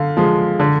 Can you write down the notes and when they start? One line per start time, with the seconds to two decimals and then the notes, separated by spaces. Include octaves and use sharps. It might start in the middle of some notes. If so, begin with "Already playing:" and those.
Already playing: D3 F5
0.17 F3 G#3
0.60 D3